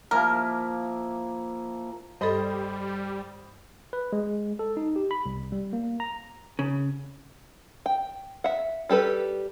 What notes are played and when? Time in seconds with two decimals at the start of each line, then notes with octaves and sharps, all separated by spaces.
0.11 F3 A#3 E4 A#4
2.21 G2 G3 A4 C5 D#5 B5
3.93 B4
4.12 G#3
4.59 A4
4.77 D#4
4.96 G4
5.11 B5
5.26 C2
5.52 G3
5.73 A#3
6.00 A#5
6.59 C#3
7.86 G5
8.44 E5 F#5
8.89 G3 G4 A4 B4